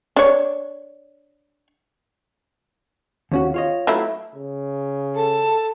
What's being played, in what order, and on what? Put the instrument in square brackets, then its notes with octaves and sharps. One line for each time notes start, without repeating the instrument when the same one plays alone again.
[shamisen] D4 C#5
[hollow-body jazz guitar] D#2 C#4 F#4
F4 C#5 D#5
[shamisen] F#3 A3 E4
[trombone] C#3
[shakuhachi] A4 [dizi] A5